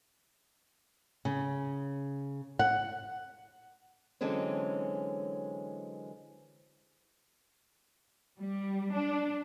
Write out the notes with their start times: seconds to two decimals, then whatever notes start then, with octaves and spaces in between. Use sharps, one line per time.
1.25 C#3
2.59 F#5
4.21 D3 E3 F#3 G#3 C4 C#4
8.39 G3
8.94 D4